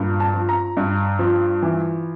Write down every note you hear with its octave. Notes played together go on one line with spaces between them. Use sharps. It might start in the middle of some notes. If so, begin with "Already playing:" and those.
Already playing: G2 A#2
A5
F3
A#5
G2
F3
E3